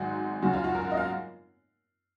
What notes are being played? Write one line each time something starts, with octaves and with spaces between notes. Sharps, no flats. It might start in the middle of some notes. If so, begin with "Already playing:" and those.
Already playing: G#1 G#2 F#3 F#4
F#2 C#3 F#3 F#4
F4
F#4
A#4
D#5
F5